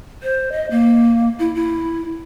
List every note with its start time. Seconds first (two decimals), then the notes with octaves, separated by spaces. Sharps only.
0.23 C5
0.52 D#5
0.71 A#3
1.39 E4
1.55 E4